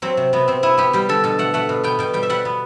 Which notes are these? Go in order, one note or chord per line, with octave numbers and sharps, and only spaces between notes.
F#3 C4
C3
C3 B3
C3 C4
B3 E4
B3 G4
G3 G4
D3 A4
B2 A4
A3 F#5
A3 F#5
B2
B3 G5
B2 G5
G3 G5
E5
G3 F#5
B3